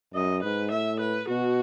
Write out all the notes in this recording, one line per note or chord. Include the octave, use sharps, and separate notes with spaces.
F#2 D#5
G#2 B4
A2 E5
B4
B2 F#4